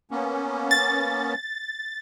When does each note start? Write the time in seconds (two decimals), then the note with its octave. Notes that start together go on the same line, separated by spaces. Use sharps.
0.11 A#3 B3 C#4
0.71 A6